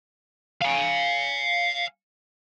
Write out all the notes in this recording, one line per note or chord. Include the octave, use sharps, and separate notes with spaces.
F5 G#5